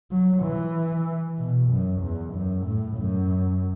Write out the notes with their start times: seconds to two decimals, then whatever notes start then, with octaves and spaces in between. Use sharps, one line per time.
0.11 F#3
0.43 E3
1.38 B2
1.70 F#2
2.02 E2
2.34 F#2
2.65 A2
2.97 F#2